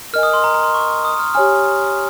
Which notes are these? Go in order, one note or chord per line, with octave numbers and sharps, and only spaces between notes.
A#4 D#5 G#5 F6
D#6
C6
A#5
A#5
C6
C#6
D#6
F6
G4 C#5 G#5 F6